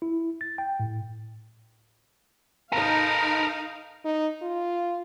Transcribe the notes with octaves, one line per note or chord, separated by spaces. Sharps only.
E4
A6
G5
A2
D#4 A4 A#4 F5
D#4
F4